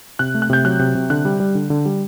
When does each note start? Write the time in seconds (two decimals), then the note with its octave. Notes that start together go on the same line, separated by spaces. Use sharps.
0.19 C3 F#6
0.34 A3
0.42 F#6
0.50 C3 G6
0.65 F#3 F#6
0.79 C3
0.95 C3
1.10 D3 F#6
1.25 G3
1.40 G3
1.55 D3
1.70 D3
1.85 G3